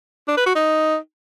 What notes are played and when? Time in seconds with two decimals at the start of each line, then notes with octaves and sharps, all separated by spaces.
0.28 D4
0.37 B4
0.46 F#4
0.56 D#4